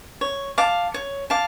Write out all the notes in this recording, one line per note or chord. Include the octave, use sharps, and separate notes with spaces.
C#5
F5 A5 D6
C#5
F5 A5 D6